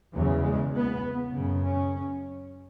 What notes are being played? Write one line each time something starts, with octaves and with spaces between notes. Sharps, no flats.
E2 C#3 F#3
G#3
B3
F#2 C#3
C#4